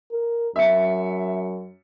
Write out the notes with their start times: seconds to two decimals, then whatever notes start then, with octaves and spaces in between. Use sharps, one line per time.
0.12 A#4
0.56 F#2 E5 C#7